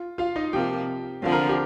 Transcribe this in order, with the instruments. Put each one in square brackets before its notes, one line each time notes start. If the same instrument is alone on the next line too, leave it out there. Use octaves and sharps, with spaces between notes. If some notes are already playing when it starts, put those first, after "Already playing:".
Already playing: [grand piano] F4
F4 F5
D#4 D#5
[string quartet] C3 F3 A#3 [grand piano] G4 G5
[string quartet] D3 F3 C4 [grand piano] F4 F5
[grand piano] A#4 A#5
G4 G5